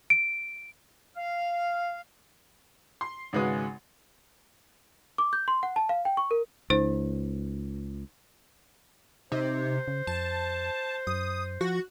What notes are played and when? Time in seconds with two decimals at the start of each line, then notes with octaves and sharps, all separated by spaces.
0.10 D7
1.16 F5
3.01 C6
3.33 G#1 C#3 G#3 F#4 B4 D#6
5.18 D6
5.33 G6
5.48 C6
5.63 F#5
5.76 A5
5.89 F5
6.05 G5
6.17 C#6
6.31 A#4
6.70 C#2 D#4 C5
9.32 C3 D#4 C5
9.88 C#3
10.07 F2 A5
11.07 F#2 D#6
11.61 F3 F#4